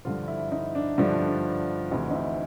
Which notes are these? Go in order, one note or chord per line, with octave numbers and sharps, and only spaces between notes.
G2 D3 F3 F4
E4
D#4
D4
G2 D3 F3 D4
D2 C3 E3 D#4
D#4
E4